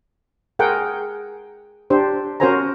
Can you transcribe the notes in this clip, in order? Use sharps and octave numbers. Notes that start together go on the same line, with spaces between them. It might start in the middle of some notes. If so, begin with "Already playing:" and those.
G#4 A#4 F#5 G5
D4 G4 C5
C#4 F#4 A#4 C5 G#5 A#5